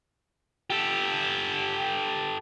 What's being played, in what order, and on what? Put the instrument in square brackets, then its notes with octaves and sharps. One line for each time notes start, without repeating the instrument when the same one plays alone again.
[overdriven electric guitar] G4 A4